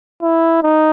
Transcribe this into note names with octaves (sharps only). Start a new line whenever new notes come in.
E4
D#4